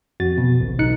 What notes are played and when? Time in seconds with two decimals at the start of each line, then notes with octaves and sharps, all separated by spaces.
0.20 F2 F#4 A6
0.38 B2
0.60 A1 D2
0.79 B1 D#4 F#6 C#7